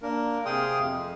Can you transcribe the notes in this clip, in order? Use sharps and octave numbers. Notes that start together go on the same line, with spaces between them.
A#3 D4 A#4
C3 G#4 F5 G5 C6 D#6
F2